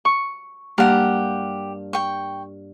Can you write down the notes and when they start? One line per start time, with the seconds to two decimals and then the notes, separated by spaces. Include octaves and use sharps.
0.05 C#6
0.78 G2 A#3 G4 F#5 F6
1.93 G5 C#6